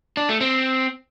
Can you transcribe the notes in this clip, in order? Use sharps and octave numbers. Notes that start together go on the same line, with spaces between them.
D4
A3
C4